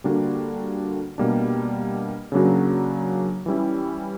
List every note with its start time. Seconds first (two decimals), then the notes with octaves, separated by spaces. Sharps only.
0.04 D3 G3 A#3 D4 F#4
1.18 B2 G3 A#3 D4
2.32 C#3 F#3 A#3 D4 F#4
3.46 E3 G3 C#4 E4